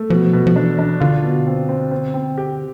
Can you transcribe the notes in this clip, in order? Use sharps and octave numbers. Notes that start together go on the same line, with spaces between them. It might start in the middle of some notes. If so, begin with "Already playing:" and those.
Already playing: A3
B2 F3
B2
F3
E3 D4
D4
D3 F4
B2
C4
C4
C4
C4
G4